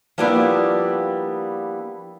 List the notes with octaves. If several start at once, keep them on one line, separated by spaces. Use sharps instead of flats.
F3 G3 A#3 B3 D4 E4